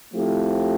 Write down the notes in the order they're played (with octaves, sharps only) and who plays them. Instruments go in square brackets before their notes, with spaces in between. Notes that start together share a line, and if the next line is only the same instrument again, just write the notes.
[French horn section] F3 A3 C4 E4 G4